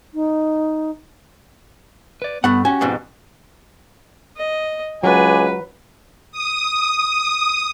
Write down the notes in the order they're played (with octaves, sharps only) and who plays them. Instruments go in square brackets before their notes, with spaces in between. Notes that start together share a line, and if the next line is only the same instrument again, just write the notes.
[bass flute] D#4
[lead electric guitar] B4 D5
[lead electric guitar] G2 [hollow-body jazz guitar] A3 F#5 [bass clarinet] B3
[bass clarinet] C#4 [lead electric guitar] F#4 G4 [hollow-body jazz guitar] G#5
[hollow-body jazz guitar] F2 G#2 B2
[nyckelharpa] D#5
[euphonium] C#2 [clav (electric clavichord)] F#3 [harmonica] D4 G#5 [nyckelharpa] B4
[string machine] D#6